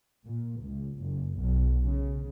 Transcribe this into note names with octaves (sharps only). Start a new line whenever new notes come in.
A#2
C#2
F#1
B1
C#3